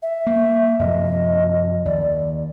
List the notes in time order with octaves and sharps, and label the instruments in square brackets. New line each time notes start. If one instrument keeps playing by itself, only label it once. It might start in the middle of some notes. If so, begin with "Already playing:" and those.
[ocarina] E5
[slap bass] A#3
[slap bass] F#2 C3 F3 [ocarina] D#5
[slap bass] D#2 [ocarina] D5